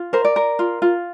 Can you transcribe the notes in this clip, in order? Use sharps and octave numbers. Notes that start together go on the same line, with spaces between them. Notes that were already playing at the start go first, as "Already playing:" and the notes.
Already playing: F4
A#4 C5
D5
A#4
F4
F4